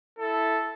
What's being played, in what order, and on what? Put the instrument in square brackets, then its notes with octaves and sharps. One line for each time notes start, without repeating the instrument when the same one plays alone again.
[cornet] E4 [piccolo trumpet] A4